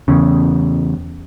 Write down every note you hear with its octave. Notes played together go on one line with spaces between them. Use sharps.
E2 C#3